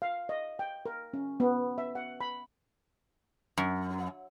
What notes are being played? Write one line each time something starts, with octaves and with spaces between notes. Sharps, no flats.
F5
D#5
G5
A#4
C#4
B3
E5
F#5
B5
F#2